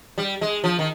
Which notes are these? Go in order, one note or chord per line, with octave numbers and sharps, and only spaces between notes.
G3
G#3
F3
D#3